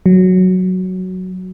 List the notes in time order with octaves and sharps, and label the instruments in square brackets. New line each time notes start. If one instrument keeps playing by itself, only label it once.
[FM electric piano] F#3